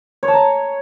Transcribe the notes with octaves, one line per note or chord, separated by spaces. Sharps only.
C#5
A5
A#5